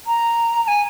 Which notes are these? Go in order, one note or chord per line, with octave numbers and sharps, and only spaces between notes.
A#5
A#5
G#5